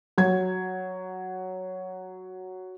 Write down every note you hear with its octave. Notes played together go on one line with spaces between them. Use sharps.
F#3 G#6